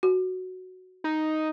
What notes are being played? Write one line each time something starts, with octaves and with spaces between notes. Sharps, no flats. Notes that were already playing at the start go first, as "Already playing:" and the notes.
F#4
D#4